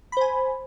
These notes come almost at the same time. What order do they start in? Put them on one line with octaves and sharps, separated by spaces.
B5 C5 G#5